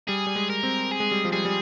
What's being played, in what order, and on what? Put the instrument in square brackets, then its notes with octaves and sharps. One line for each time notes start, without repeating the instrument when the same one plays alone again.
[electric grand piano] G3 [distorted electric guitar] G#4
[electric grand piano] G3
G#3
[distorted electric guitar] A#4
[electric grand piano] C4
[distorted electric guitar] G#4
[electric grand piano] G#3
G3
F3
[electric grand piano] G3 [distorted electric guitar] G#4
[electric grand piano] G3